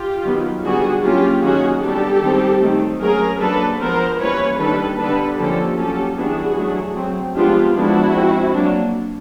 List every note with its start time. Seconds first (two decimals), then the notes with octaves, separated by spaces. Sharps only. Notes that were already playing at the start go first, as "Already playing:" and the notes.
Already playing: F4 G4
0.24 D#3 F#3 B3
0.63 D3 G3 B3 D4 F#4 G#4
1.03 F#3 A#3 C#4 F4 G4
1.42 D#3 F#3 A#3 C#4 F#4 G#4
1.82 G3 B3 D4 G4 A4
2.21 D#3 G3 C4
2.61 D#3 F#3 A3 C4
3.01 F#3 A3 C#4 G#4 A#4
3.40 F#3 A#3 D4 A4 B4
3.80 F3 G#3 B3 A#4 C5
4.19 E3 G3 A#3 C#4 B4 C#5
4.58 D#3 G3 A#3 D4 A4 B4
4.98 D3 G3 B3 D4 A4 B4
5.37 D3 F3 A#3 C#4 G4 A4
5.77 F#3 A#3 C#4 G4 A4
6.17 E3 G3 B3 D4 F#4 G#4
6.56 F#3 A3 D4
6.96 F#3 A3 C4
7.35 F3 G#3 B3 D4 F4 G4
7.75 F3 G#3 B3 D4 E4 F#4
8.14 F3 G#3 C4
8.54 F#3 A#3 D4